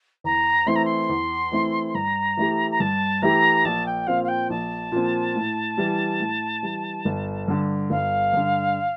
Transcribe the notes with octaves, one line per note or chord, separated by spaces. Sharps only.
E2 A#5
E3 A3 C4 E4 C6
A#5
C6
E2
E3 A3 C4 E4
G2 A#5
E3 A3 E4 G4
A#5
G2 A5
E3 A3 E4 G4 A#5
A#1 A5
G5
A#2 F3 C4 F5
F5
G5
A#1 A5
A#2 F3 C4
A2
E3 G3
A2
E3 G3
G1
G2 D3
G1 F5
G2 D3